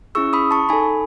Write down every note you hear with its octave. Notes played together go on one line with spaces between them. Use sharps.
C#4 E4 G#4 C#6 E6
B5 D#6
A5 C#6
D#4 A4 G#5 B5